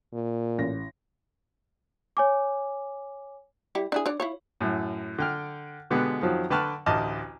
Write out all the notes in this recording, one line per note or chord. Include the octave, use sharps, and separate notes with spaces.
A#2
A1 A#6
C#5 G#5 D6
G3 E4 G4
D4 E4 G#4
D4 C#5 D5
E4 F4 C#5
F#2 A2
D3 G5 F6
B2 D3 G#3 B3 G4
F2 D#3 F3 F#3
D3 B4 G5 A5 C#6 F6
A1 D2 D#5 A5 D6 F6